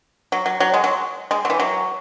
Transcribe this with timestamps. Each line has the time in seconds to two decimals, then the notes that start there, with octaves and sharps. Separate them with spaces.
0.32 F#3
0.46 F#3
0.60 F#3
0.74 G#3
0.84 F#3
1.31 G#3
1.45 F#3
1.50 E3
1.59 F#3